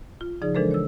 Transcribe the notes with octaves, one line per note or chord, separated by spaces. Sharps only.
F4
C#3 F3 D#4 G#4 D5
E3 G#3 D4 A4 A#4 C5
C#5 E6